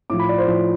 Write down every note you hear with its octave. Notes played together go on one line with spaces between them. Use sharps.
A2 F3 D6
B5
D5
C5
A2 F3